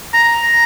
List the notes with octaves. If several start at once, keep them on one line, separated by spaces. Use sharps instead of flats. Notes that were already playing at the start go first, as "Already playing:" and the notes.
A#5